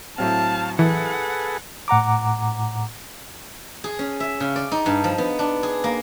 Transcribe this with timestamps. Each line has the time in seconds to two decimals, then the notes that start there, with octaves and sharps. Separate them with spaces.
0.18 A2 F#3 C4 F5 A5
0.79 E3 G#4 A4 B4 F#5
1.88 A2 F#5 A#5 D6
3.84 G#4
3.99 C#4
4.20 E5
4.40 C#3
4.56 D5
4.72 D#4
4.86 G2
5.04 F3
5.18 B3
5.39 D4
5.63 G#4
5.84 A#3